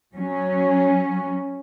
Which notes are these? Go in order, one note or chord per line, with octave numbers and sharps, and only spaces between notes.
F#3 C#4